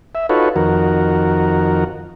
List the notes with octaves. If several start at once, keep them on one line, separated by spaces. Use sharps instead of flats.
E5
D#4 F4 F#4 A4 B4 C#5
F2 D#3 F#4 A#4